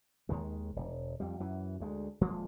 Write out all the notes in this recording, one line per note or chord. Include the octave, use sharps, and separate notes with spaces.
D#2 D#3 G#3
E1
F2 G3
F#2 E3
D2 G#3
D#1 F3 G#3 A#3